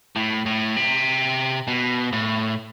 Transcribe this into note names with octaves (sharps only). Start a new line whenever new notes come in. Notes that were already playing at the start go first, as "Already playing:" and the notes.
A2
A2
C3
B2
A2